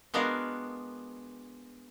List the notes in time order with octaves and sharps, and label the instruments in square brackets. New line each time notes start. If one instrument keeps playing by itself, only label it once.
[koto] G#3 B3 D4 F4 F#4 A#4